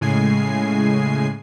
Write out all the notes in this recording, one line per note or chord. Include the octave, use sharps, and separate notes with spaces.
A2 C#3 G#3 G#5 C7